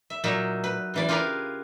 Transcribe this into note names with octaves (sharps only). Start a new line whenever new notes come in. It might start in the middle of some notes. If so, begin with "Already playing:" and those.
E5
A#2 F#3 D#4 E5
B4
C#3 E3 D5
F4 G4 G#4 A#4 B4 F5